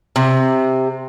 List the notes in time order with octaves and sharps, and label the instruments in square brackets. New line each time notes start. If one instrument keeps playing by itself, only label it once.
[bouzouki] C3